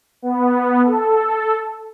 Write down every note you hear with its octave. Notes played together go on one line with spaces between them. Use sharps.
B3
A4